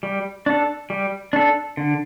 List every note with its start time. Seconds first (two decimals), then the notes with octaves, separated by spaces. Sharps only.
0.03 G3
0.46 D4 A4
0.90 G3
1.33 D4 A4
1.77 D3